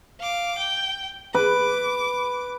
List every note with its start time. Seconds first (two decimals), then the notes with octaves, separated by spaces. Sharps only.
0.20 F5 D6
0.58 G5
1.35 B4 D6